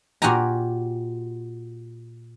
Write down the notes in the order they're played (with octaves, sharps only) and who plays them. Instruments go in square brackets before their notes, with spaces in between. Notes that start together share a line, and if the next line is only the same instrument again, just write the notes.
[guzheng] A#2 F#4 G4 G#5 A#5